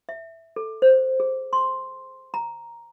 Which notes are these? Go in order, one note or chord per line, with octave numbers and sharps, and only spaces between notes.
E5
A4
C5
G#4
C6
A#5